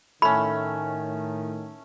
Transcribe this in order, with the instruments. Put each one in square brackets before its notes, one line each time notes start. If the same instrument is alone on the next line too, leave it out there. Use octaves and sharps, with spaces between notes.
[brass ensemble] A2 D#3 [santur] A3 C#4 [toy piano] B5